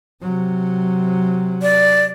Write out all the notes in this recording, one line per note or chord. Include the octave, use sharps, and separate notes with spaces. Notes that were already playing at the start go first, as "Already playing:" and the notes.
C3 F#3
D5